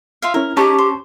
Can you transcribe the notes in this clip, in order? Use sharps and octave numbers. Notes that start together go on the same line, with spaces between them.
F4 E5 F5
C#4 E4 A#4
C#4 D#4 G4 G#4 A5 C#6 D6
C5